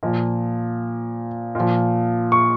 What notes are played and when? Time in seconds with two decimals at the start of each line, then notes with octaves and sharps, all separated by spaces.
0.03 A#2 F3
1.55 A#2 F3
2.32 C#6